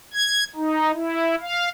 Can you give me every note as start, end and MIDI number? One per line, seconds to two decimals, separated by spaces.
0.14 0.44 92
0.56 0.92 63
0.94 1.35 64
1.41 1.69 77